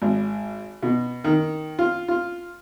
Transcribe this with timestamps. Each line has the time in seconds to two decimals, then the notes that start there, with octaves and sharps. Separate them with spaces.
0.02 G#1
0.82 B2
1.24 D#3
1.79 F4
2.08 F4